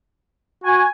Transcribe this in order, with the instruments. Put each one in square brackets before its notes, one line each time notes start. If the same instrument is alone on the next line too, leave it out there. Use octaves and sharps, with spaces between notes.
[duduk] F#4 [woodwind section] G#5